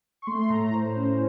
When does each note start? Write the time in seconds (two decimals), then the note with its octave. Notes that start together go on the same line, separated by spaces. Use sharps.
0.22 C#6
0.27 A3 C6
0.50 A2 A#5
0.73 A2 C5
0.97 C#4